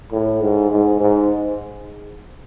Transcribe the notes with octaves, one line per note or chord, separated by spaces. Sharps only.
A2
G#2
G#2
G#2